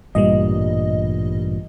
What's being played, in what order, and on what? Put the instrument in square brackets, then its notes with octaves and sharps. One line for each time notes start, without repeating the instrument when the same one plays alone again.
[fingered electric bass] A1 G2 A#2 [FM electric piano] G3 D#5